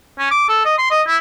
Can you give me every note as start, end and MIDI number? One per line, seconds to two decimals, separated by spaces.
0.19 0.28 61
0.31 0.48 86
0.49 0.61 69
0.65 0.74 75
0.78 0.86 84
0.91 1.02 75
1.07 1.17 64